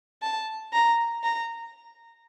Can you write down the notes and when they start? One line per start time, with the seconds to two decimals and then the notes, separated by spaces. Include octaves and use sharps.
0.22 A5
0.73 A#5
1.23 A#5